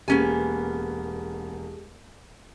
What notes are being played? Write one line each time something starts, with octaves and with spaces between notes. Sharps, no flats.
E1 A#3 B3 C#4 G4 G#4 G#5